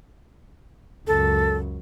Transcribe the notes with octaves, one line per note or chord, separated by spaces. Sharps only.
C#2 F#2 A4